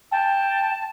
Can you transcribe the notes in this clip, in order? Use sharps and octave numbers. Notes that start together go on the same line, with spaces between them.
G5 A5